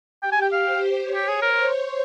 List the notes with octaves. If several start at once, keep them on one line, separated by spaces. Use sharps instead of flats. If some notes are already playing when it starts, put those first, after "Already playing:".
G4 G5
G#5
G5
F5
C5
C#5
G4
G#4
A#4 C5